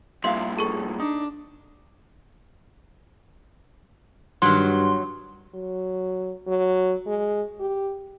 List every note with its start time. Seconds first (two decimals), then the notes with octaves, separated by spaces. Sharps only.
0.24 G2 A#2 E5 F5 C6
0.59 G#4 A4 C#6
0.99 D4 D#4
4.42 G2 D#3 F#3 C6
5.55 F#3
6.47 F#3
7.07 G#3
7.60 G4